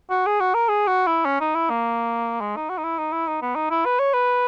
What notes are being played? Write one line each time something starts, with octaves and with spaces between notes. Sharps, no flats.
F#4
G#4
F#4
A#4
G#4
F#4
E4
C#4
D#4
E4
A#3
G#3
D#4
F#4
D#4
E4
D#4
E4
D#4
B3
D#4
E4
B4
C#5
B4